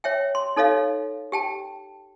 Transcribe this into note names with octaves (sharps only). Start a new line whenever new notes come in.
C#5 E5 G5
C6
D#4 A4 C#5 D#5 F5
G4 G5 A5